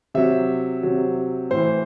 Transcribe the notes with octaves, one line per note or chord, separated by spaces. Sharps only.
C3 F#3 E5
C3 F#3
A2 E3 C5